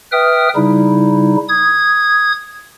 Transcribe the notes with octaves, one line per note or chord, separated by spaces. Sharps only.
B4 E5 G5 D#6 F6
C#3 G3 D#4 E4
D#6 G#6